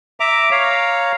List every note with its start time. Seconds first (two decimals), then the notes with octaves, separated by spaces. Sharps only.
0.20 E5 A#5 D6
0.51 C#5 F5 A#5